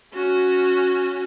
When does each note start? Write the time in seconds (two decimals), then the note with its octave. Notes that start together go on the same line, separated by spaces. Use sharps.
0.13 C#4 F#4